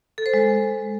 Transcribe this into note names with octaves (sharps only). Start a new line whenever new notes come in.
A4
C5
G#3